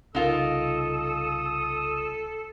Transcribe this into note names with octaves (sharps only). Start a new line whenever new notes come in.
C2 C#3 D#4 F4 A4 A#4 D#6